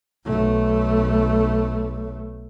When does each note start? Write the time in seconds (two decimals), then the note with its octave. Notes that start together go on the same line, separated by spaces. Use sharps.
0.25 B1 A3